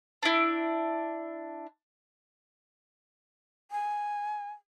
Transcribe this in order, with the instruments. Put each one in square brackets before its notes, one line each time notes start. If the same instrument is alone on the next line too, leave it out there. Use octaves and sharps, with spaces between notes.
[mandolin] D4 E4
[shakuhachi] G#5